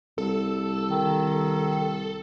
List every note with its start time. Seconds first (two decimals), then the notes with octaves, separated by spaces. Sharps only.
0.18 C2 A4
0.90 D#3